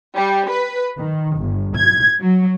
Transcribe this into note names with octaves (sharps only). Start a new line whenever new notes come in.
G3
B4
D#3
G1
G#6
F#3